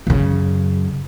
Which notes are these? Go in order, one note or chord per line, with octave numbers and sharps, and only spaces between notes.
F#2 C#3